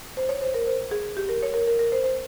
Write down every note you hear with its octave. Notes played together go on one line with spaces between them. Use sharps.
C5
C#5
C5
A#4
C5
G#4
G4
A#4
C#5
A#4
A#4
A#4
C5
C5